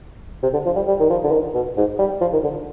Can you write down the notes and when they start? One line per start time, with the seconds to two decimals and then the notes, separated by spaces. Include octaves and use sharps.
0.43 C3
0.53 D3
0.66 F3
0.76 G3
0.88 G3
0.99 D#3
1.10 F3
1.24 D3
1.32 D#3
1.54 B2
1.77 G#2
1.99 G3
2.21 F3
2.33 D#3
2.43 D3